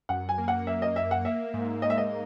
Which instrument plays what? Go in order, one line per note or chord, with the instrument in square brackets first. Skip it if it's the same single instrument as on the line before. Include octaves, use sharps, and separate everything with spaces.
[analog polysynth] F#2 [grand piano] F#5
[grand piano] G#5
[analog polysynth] A#3
[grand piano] F#5
[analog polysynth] A#3 [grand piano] E5
[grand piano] D#5
[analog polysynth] A#3 [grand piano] E5
[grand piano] F#5
[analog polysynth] A#3 [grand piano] E5
[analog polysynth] G#2
[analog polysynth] G#2 [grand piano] D#5
[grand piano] E5
D#5